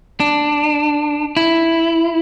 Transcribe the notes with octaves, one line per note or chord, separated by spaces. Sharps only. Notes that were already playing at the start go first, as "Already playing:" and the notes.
D4
E4